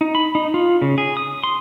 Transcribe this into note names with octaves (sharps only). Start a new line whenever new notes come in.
D#4
B5
D#4
F4
C#3
G#4
D#6
C6